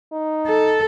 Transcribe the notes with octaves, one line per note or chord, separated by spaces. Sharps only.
D#4
A4